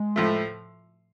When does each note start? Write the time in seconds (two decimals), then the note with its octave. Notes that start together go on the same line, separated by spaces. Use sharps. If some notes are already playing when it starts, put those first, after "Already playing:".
Already playing: G#3
0.16 A2 F3 A3